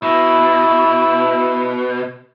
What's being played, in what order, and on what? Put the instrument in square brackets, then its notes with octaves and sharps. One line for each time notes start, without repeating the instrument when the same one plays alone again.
[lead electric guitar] B2 [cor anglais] E4